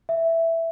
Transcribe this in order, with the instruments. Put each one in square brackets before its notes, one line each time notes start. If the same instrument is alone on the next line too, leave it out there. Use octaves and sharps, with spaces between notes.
[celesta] E5